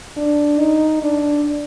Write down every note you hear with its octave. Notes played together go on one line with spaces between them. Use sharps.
D4
D#4
D4